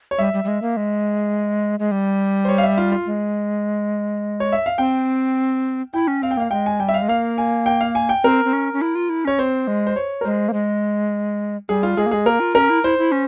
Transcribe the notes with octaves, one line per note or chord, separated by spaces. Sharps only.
C#5
G3 E5
G3
G3
G#3
A#3
G#3
G#3
G3
C5
C#5
F5
E5
F4
F4
G#3
C#5
E5
F5
C4 G5
E4 G5
C#4
C4 F5
G5
A#3 F5
G#3 G5
G#5
G3 G5
E5
F5
G#3
A#3 F5
G#5
G5
F5
G#5
G5
C4 A#4
C4
C#4
C#4
E4
F4
E4
C#4 C#5
C4 C5
G#3
C5
C#5
A#4
G#3 C5
A#3
G#3
G3 G#4
F4
G#3 G#4
A#3
G#3 G#4
A#3 A#4
F4
C#4 A#4
E4
E4 C5
E4
C#4